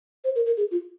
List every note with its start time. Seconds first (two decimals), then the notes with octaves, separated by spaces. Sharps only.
0.24 C5
0.36 A#4
0.46 A#4
0.57 G#4
0.71 F4